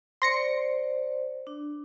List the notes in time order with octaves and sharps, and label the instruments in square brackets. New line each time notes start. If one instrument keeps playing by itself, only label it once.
[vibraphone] C5 D5 [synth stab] C6 A#6 C#7
[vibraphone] D4